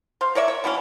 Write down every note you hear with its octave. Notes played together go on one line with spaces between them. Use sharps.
C5 F5
A#4 C#5 D5 E5
C#5
B2 E3 A#3 C#4